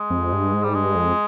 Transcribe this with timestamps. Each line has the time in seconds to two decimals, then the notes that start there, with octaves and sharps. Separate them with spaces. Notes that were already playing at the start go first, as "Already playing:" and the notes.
Already playing: G#3
0.10 F2
0.33 G2
0.54 G#2
0.64 G3
0.75 G2 G#3
0.95 F2